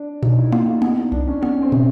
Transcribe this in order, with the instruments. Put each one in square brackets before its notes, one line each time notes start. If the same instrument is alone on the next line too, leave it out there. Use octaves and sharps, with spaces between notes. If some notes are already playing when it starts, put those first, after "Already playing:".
Already playing: [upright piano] D4
[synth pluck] B2 [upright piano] D#4
[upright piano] E4
[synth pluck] A#3 [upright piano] F4
[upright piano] F#4
[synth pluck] B3 [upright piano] E4
[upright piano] D#4
[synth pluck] C2 [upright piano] D4
[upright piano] C#4
[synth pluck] B3 [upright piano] C#4
[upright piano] C4
[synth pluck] B2